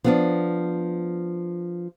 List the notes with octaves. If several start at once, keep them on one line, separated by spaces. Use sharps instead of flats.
F3 B3 D4